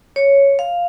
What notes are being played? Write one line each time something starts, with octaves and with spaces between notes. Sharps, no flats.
C#5
F5